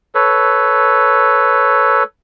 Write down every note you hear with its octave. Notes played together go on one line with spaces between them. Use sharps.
A4 B4 C#5